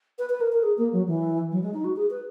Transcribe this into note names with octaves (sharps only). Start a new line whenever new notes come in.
B4
B4
A#4
A#4
G#4
A#3
F#3
E3
F#3
G#3
D#4
F#4
G#4
B4